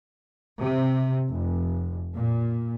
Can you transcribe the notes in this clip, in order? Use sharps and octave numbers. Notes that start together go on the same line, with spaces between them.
C3
F1
A#2